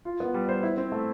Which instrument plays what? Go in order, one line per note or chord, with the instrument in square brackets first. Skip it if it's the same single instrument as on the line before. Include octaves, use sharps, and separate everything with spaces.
[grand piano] F4
B3
G3
C5
E4
C4
A3